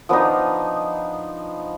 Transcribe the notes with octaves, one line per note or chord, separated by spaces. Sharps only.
F3 B3 D4 D#4